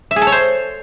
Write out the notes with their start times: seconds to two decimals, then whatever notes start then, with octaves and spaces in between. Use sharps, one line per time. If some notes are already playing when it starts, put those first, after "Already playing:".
0.11 E5
0.16 G#4
0.22 A4
0.27 C#5
0.32 C5